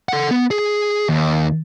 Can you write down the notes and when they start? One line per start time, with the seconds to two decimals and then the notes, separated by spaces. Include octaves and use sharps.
0.09 A4 F#5
0.31 B3
0.51 G#4
1.09 D#2